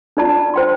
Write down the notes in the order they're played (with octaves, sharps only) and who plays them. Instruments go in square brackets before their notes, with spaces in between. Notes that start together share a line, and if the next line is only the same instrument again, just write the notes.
[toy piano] D4 F4 D5 A5
C5 G5 C6